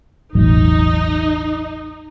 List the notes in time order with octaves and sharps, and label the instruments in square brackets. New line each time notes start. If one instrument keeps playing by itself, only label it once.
[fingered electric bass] E1 A1 F#3 [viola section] D#4